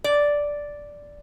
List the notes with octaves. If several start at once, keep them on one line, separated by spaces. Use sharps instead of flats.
D5